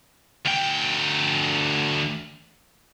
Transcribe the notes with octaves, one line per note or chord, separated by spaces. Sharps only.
D2 G5